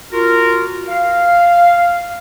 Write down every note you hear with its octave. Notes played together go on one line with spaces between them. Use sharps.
F4 F#4 A#4
F5